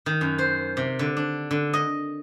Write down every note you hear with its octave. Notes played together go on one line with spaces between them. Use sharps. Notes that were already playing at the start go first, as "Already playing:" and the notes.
D#3
F#2
C5
C3
D3
D4
D3
D#5